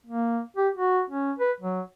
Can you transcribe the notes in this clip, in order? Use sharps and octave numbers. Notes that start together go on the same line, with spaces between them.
A#3
G4
F#4
C#4
B4
F#3